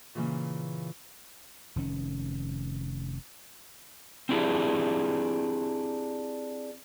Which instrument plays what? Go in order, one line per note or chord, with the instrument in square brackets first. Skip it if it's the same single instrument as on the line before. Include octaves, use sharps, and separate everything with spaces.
[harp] A#2 C#3 E3 A#3
[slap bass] F1 D#3 C#4
[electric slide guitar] C4 D4 E4 G4 G#4